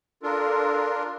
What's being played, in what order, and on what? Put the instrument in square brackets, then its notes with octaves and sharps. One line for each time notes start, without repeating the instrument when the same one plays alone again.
[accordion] D4 F4 A#4 [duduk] A4